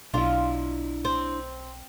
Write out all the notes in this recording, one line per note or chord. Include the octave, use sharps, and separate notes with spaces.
B1 D4 E4 F4
C4